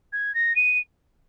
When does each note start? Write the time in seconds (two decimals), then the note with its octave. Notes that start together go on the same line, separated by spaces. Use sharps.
0.12 G#6
0.34 A#6
0.55 D#7